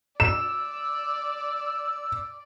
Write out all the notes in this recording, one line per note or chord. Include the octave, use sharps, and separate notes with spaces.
D5 E6 E7